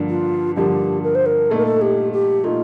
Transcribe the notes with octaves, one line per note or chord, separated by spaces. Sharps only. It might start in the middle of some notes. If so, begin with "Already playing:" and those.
Already playing: G2 D3 F3 A#3 D4
F4
G2 D3 F3 A#3 D4 G4
A#4
C5
A#4
A#2 A3 D#4 A4
A#4
A4
G4
G4
A#2 A3 D#4 F4